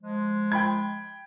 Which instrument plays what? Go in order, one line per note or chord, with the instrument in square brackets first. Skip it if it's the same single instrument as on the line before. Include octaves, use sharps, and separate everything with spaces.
[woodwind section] F3 G#3
[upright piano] G5 B5 G#6